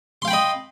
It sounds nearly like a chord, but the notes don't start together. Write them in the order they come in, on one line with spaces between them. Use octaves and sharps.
C6 F5 G5 B5 D#5